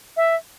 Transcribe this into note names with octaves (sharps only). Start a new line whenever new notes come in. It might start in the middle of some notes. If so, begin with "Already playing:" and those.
E5